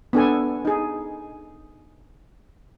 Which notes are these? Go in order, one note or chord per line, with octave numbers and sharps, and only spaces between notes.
B3 D4 A4 G#5
D#4 G#4